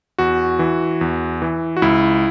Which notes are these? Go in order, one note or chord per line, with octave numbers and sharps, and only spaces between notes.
E2 F#4
E3
E2
E3
F#4
C#2 E4